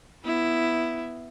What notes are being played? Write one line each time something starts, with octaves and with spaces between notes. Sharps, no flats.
B3 E4